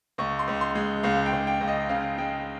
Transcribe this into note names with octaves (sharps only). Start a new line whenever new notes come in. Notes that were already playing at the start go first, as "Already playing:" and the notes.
C#2 C#6
C6
C#2
C6
G#3
C#2 F5
G5
C#2
G5
C#2
D#5
C#3 F5
G#3 G5